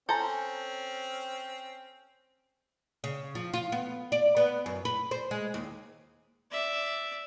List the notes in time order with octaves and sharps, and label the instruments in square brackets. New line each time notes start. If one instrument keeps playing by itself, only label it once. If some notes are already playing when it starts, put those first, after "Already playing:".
[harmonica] C4 C#4 [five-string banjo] A4 A#5 [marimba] G#5 C6 G6
[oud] C#3
F3
F4
B3
D5
B3
F#2
B4
C5
G#3
D#2
[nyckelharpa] D5 E5